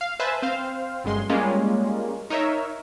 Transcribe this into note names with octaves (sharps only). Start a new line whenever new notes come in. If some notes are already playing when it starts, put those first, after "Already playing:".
F5
B4 C5 E5 G#5 A5
C4 C5 F5
G1 F#2 G#3 C6
G3 G#3 A#3 C#4 F4
D#4 A#4 C#5 E5